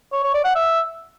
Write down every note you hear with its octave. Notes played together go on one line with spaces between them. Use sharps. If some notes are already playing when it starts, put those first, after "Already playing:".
C#5
C#5
D5
F#5
E5